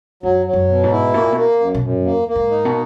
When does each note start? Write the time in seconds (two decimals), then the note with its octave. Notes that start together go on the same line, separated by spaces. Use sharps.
0.23 F#2 F#3
0.46 F#3
0.53 F#2
0.68 B2
0.84 G#2
0.92 E4
1.14 B2 A#3
1.23 A#2
1.32 B2 A#3
1.60 F#2
1.74 B2
1.82 F#2
2.04 E2 A#3
2.28 A#3
2.35 G#2
2.51 D#4
2.65 B2